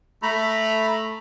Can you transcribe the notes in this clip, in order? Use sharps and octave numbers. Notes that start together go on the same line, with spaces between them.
A3 A#5 B5